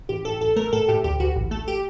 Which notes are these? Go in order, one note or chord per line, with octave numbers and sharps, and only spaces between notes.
A1 G4
A1 A4
A1 A4
A3 A#4
A2 A4
A2 G4
D2 G4
D2 F#4
A1
A3 A4
G4